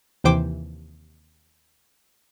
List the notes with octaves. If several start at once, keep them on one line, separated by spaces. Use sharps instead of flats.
D#2 C3 E3 C5 G5 D6